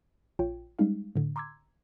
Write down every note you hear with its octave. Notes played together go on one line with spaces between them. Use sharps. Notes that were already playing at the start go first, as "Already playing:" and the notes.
A#1 F4 C#5 G5
G3 G#3 C#4 D#4 F5
A2 D3
A#5 C6 D6 E6 G#6